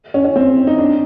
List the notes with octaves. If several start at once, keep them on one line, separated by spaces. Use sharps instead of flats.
C#4
C#4
C4
D#4
D4